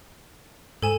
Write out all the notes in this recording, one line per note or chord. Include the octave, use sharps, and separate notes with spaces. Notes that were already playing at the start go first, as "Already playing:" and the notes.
G#2 A4 G#5 E7